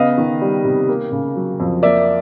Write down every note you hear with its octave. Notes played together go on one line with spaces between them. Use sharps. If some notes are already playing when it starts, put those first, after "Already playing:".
Already playing: C#3 B3 D#5 F5
D#3
G3
C3
A#3
C#3
F#3
F2
A#3 D5 E5